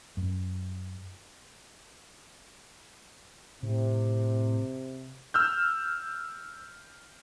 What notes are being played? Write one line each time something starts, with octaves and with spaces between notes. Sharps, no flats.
F#2
A2 C3
E6 F6 G6